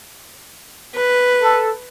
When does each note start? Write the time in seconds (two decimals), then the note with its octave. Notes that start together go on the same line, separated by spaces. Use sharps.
0.95 B4
1.41 A4